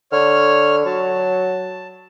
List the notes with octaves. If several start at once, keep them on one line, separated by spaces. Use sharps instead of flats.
D3 C#5 F6
F#3 A5